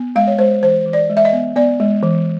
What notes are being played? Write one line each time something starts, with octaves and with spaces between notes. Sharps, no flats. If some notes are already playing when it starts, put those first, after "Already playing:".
Already playing: B3
G#3 F5
C#5
G#3 C5
E3 C5
E3
D5
G#3
E5
D#5
B3
B3 D5
G#3
E3